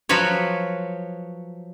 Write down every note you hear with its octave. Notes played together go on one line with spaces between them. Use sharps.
F3 F#3 F#4 B4 C#5